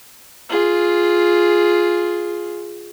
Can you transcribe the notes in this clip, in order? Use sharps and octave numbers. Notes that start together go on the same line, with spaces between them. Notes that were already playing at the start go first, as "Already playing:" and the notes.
F4 G#4